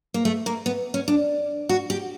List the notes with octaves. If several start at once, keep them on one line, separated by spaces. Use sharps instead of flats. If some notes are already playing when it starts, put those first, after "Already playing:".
A#3
A3
A#3
B3
C#4
D4
F#4
G4